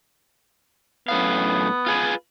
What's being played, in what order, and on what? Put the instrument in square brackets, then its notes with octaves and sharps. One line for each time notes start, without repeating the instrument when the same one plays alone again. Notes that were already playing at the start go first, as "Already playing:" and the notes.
[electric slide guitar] F#2 A2 F5 [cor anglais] B3
[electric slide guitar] F4 G#4 B4